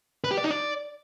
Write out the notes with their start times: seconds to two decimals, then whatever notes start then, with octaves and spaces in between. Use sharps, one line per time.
0.24 B4
0.31 G4
0.37 D5
0.44 D#4
0.51 D5